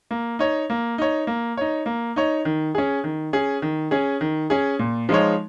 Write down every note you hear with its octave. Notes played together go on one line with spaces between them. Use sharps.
A#3
D#4 C#5
A#3
D#4 C#5
A#3
D#4 C#5
A#3
D#4 C#5
D#3
C#4 G#4
D#3
C#4 G#4
D#3
C#4 G#4
D#3
C#4 G#4
A#2
F3 G#3 D#4 C#5